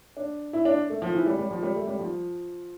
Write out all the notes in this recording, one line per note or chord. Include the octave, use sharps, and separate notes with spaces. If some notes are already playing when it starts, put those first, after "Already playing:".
D4
E4
D4
A3
F3
E3
G3
G3
F3
G3
A3
G3
F3